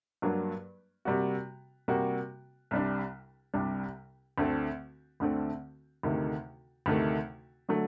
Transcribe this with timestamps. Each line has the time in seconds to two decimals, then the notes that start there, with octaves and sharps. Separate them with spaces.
0.22 G2 F#3 A#3 D4
1.05 C3 G3 A#3 F#4
1.88 C3 G3 A#3 F#4
2.71 C2 C3 G3 D4
3.54 C2 C3 G3 D4
4.38 D2 D3 A3 C4
5.20 D2 D3 A3 C4
6.03 D2 C3 D#3 A3
6.86 D2 C3 D#3 A3
7.69 D3 F#3 A3